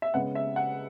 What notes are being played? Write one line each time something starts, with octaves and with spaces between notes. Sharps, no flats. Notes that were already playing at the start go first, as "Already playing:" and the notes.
E5
C#3 G#3 B3 F#5
E5
F#5